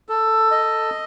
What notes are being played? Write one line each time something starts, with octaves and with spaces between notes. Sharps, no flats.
A4
D#5